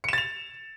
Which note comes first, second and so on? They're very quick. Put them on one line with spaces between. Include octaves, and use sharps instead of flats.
C#7 E7 A6 F7